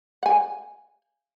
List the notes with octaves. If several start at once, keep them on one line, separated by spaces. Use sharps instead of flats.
F#5 G#5